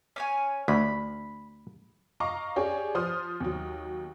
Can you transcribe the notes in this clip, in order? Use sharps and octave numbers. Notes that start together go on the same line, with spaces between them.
C#4 C#5 G#5
D2 B5
D#5 F5 A#5 C#6 D6
C#4 D4 G4 G#4 C#5
F3 C5 C6 D#6 F6
D#2 F#3